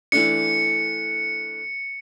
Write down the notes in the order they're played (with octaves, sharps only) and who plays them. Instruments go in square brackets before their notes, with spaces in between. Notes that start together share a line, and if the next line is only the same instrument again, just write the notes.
[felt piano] E3 A3 D4 [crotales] C#7